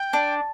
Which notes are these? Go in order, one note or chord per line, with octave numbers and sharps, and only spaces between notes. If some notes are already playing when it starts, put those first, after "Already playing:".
Already playing: G5
D4